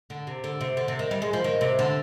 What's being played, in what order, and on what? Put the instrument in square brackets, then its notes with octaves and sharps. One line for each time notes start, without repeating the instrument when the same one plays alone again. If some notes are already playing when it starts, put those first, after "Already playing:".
[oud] D3
C3
D3
C3
D3
C3
D#3
G3
G#3
F3
D#3
C3
D3